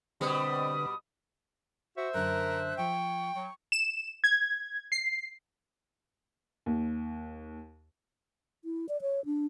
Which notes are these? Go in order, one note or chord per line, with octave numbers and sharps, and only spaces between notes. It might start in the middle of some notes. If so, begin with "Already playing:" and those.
B2 D3 G3 C4 B4 D#6
F#4 C5 E5
F#2 D3 A#4 F#6
F3 G5 C#6
F#3 C#6
E7
G#6
C7
D#2
E4
D5
C#5
D4